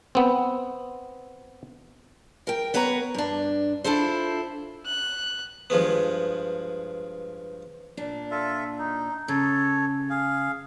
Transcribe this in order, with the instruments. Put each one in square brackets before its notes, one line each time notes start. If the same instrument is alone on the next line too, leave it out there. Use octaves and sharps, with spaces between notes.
[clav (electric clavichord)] B3 C4
[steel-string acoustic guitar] A#4 G5
B3 B4 C#5 A#5
G2 D4
D4 E4 F4 A4 C5
[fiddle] F#6
[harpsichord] G2 F3 G#3 B3
[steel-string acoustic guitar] A#2 D4
[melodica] F4 A4 E5
D#4
[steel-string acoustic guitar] C#3 [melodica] A4 C#5
[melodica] G#4 F5